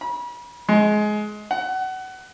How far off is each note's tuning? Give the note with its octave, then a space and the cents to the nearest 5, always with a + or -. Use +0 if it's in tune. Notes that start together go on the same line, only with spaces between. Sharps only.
B5 -40
G#3 +20
F#5 +25